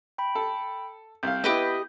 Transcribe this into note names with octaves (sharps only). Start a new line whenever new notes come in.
G5 B5
A4
C2 F5 G6
B3 E4 G4 B4 D#5